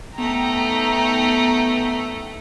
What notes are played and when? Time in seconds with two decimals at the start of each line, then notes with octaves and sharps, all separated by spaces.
0.18 A3 B3 D#4 G5 A#5